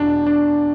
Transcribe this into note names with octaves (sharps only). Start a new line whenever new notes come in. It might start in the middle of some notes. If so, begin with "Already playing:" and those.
Already playing: E2 B2 D4
D4